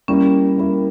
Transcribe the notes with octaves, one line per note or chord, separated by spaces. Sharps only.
G3 A#3 C#4 E4 A#4
G3 A#3 E4 A#4